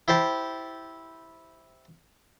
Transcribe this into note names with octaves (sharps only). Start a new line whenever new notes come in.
E4 G4 C5 A5